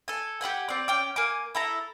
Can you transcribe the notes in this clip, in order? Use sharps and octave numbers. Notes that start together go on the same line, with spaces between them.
A4 G#5
G4 B4 F#5 G#5
C4 D5
C#4 G5 D6
A#3 G#5 D6
E4 A4 A#5